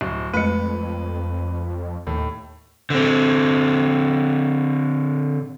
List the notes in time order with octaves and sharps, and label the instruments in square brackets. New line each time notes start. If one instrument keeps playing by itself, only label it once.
[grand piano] D1
[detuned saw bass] F2 [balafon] G#3 A3 [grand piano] B4
[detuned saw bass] D#2 [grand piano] A2
[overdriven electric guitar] D3 C4